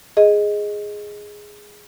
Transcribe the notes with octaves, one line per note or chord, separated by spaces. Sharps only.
G#4 D#5